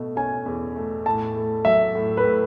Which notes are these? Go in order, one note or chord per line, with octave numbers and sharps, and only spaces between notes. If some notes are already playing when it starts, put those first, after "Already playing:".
Already playing: B2 A3
C#4 G#5
E2
A3
A2 A5
A3
F#3 E5
A2
B4
A2